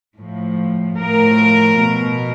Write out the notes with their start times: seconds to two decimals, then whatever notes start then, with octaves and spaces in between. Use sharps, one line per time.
0.17 A2 F3
0.98 A2 F3 A#4
1.79 B2